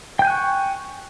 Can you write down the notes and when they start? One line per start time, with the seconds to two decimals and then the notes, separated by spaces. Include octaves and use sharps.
0.19 G5
0.22 G6
0.25 G#5
0.27 F#6
0.30 C#6